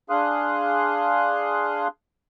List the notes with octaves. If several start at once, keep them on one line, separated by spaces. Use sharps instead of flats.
D4 G#4 F5 C6 D#6 F#6